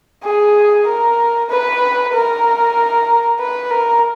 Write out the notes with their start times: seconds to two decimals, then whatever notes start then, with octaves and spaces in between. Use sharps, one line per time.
0.24 G#4
0.86 A#4
1.50 B4
2.14 A#4
3.40 B4
3.71 A#4